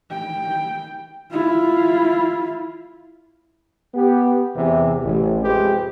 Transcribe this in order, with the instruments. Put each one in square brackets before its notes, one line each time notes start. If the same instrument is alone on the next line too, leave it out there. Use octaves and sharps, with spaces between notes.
[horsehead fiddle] G5
E4 F4
[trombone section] B3 G4
E2 C3 E3
A1
F2 C3 G#3 G4 B4 C5